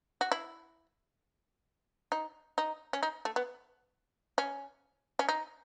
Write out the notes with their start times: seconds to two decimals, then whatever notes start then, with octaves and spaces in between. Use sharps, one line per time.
0.21 F#4
0.32 E4
2.12 D#4
2.58 D#4
2.93 C#4
3.03 D#4
3.25 A3
3.36 B3
4.38 C#4
5.19 C#4
5.29 D#4